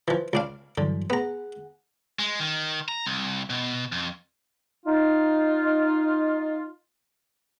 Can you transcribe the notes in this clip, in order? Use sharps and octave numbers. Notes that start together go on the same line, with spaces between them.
E3 F3
C#2 D4 F5
G2 D3 E3 F#3
B3 G#4 F#5 A#5
G#3
D#3
A#5
C2
B2
F2
D#4 F4